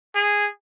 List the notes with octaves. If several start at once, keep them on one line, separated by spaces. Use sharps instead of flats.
G#4